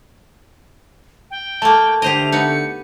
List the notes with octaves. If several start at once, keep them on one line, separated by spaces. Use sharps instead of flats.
G5
A3 A#3 A5
D3 A3 G4 C5 D#5 F7
B3 D#4 C#7